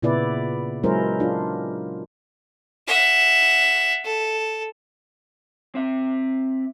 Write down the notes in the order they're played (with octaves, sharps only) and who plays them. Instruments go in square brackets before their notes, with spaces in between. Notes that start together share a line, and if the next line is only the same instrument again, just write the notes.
[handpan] A#2 C#3 B3 E4 B4 D5
F#3 G#3 C#4 E4 A#4 C5
D4 F4
[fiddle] E5 F#5
A4
[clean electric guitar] C4 E5